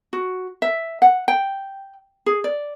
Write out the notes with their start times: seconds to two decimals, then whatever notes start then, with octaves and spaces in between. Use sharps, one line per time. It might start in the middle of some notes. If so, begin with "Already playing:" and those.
0.13 F#4
0.62 E5
1.02 F#5
1.28 G5
2.26 G#4
2.44 D5